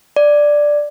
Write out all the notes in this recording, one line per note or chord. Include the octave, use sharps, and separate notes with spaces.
D5